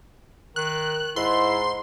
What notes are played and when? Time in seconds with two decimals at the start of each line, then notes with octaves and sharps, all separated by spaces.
0.56 D#3 F#6
1.16 G#2 E4 C6